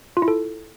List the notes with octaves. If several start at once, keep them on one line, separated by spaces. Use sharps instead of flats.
F4
E4
A4